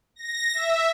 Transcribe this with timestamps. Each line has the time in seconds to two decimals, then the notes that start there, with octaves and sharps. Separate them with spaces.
0.16 A#6
0.53 E5